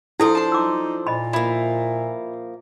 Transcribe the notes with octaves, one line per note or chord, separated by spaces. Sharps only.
F3 D4 E4 A4 C5
A5 C6
D#4 D6 E6
A#2 D#5 B5
F3 A#3 E4